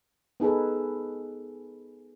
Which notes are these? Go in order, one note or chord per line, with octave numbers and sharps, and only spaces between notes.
B3 D#4 G#4 A4 B4